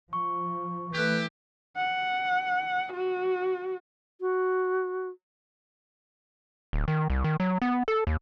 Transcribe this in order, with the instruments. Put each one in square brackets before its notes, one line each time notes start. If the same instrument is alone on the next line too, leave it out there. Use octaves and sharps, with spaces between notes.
[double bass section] F3 [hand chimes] C#6
[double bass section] E3 A3 [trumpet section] E4 G4 [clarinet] B4
[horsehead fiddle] F#5
F#4
[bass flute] F#4
[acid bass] D1
D#3
C2
D#3
F#3
B3
A4
D#2